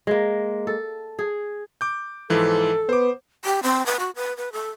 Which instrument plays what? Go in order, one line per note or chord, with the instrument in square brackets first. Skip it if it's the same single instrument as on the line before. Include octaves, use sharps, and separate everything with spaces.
[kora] G#3 A#3
A4
G#4
[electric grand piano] D6 G6
[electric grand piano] G#2 E3 F3 [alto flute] A4
[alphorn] B3 [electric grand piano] C5 D6
[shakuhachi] G4
C4
B4
F#4
B4
B4
A4